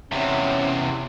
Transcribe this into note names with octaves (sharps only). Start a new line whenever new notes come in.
E2 C3 C#4